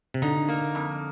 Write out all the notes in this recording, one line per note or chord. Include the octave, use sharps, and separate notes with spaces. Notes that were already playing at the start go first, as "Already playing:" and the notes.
C3
D3 D#4
A#3
F2